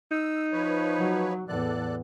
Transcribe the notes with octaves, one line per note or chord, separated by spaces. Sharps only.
D#4 E6
F3 B4 C#5
F#3
E2 A2 A4 D5 F#6